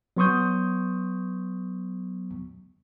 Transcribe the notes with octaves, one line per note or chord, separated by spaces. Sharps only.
F#3 B3 C6 C#6 D#6 G6